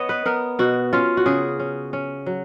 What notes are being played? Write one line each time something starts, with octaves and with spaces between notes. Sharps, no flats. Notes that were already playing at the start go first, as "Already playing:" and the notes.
Already playing: B3 C#5 D#5
B4
B3 A#4
B2 F#4
C#4 F4
F#4
C#3 G#4
C#4
C#4
F#3